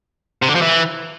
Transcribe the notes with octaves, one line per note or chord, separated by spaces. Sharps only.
C3
D3
F3
E3